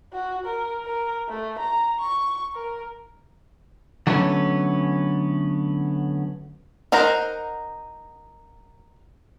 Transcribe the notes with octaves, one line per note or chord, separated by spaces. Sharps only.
F#4
A#4
A#4
A3
A#5
C#6
A#4
D3 F#3 G3 A3 B3 C#4
D#4 A#4 C5 F#5 A#5